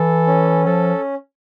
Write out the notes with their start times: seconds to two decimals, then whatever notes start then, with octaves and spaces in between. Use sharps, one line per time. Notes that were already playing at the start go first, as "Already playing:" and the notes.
Already playing: E3 A4
0.27 C#4
0.66 F3 A4